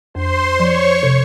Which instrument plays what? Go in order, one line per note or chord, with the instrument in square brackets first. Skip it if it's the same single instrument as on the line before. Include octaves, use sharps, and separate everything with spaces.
[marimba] F2 [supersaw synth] C5 C6
[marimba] F3 [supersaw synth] C#5 C#6
[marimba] C3